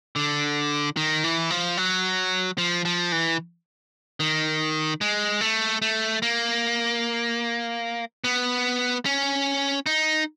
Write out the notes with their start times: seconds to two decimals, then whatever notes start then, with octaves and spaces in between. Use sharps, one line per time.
0.16 D3
0.97 D#3
1.24 E3
1.50 F3
1.77 F#3
2.58 F3
2.85 F3
3.12 E3
4.20 D#3
5.01 G#3
5.41 A3
5.82 A3
6.22 A#3
8.24 B3
9.05 C#4
9.86 D#4